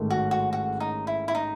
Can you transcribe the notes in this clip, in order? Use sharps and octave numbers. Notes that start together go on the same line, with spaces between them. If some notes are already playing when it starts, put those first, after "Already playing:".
Already playing: A1 G#2 D#3 A3
F#4
F#4
F#4
D#4
E4
E4
D#4